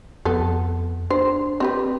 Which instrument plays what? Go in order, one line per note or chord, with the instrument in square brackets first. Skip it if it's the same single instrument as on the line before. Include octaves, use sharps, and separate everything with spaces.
[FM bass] F2 [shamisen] B3 A4
[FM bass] D4 [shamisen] C5
[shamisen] C4 G4 B4